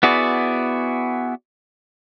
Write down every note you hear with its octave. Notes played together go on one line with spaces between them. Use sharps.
B3 E4 F#4 G#4 D5